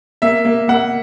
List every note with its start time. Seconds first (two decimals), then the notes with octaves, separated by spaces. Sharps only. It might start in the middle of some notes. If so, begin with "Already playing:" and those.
0.22 A#3 E5
0.45 A#3
0.68 A#3 F#5